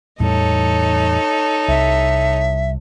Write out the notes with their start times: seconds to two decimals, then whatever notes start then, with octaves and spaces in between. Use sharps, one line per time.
0.20 E2 A2 G3 D#4 A4 C#5
1.68 C2 E5